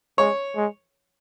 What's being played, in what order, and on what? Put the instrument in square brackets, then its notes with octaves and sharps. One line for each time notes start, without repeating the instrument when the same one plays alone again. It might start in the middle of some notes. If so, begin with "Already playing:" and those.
[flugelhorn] G#3 [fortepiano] C#5
[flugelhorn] G#3